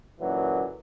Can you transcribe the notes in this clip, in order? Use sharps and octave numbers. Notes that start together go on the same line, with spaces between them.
F#2 A#2 D3 E3 F#3